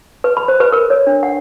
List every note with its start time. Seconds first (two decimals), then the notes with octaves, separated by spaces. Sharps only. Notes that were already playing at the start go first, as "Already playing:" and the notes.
0.24 B4
0.37 B5
0.48 C5
0.60 B4
0.72 A#4
0.90 C#5
1.07 D4
1.23 F#5